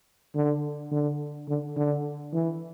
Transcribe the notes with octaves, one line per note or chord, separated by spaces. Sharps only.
D3
D3
D3
D3
E3